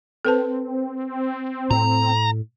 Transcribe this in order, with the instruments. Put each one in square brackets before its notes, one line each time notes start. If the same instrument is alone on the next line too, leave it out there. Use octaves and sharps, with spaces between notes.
[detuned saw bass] C4 [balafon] A4 B4 A5
[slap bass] A2 [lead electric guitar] A#5